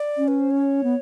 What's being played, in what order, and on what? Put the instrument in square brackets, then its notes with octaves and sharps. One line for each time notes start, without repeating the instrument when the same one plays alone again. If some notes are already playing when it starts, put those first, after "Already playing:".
Already playing: [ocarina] D5
[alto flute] C#4
[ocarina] B4
C5
C#5
[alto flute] B3